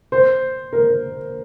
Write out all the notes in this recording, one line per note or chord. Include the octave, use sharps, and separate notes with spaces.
C5
A#4